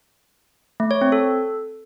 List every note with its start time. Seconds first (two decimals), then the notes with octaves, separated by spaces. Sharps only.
0.80 A3
0.91 C#5
1.01 C4
1.12 A4